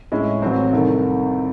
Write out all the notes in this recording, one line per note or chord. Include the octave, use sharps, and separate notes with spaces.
A2 G#3 C#4 E4
A1 A2 F#3 C4
C2 C3 D#3 A3